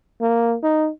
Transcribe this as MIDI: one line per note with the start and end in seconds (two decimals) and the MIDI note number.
0.21 0.56 58
0.63 0.89 63